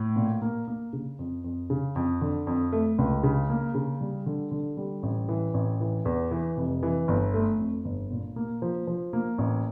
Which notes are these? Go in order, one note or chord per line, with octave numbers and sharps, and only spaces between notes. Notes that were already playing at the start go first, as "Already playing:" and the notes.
Already playing: A2
A#2
A#3
A#3
C#3
F2
F2
C#3
F2
D3
F2
A3
C#2
C#3
A#3
C#3
G3
D3
D3
G3
A1
E3
A1
E3
E2
E3
F1
E3
G1
A3
F2
G1
A#2
A#3
F3
F3
A#3
A1